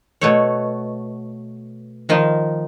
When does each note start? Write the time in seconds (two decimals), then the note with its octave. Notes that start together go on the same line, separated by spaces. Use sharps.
0.21 B2 A3 C#5
2.09 D#3 F3 D#4